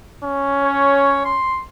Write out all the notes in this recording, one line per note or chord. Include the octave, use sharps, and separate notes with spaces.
C#4
C#5
C6